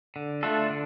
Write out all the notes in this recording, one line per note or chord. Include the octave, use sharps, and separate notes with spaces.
D3
A3 D4 F4 A4
D3